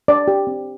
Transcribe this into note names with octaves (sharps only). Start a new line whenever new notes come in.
D4 D5
G4
C4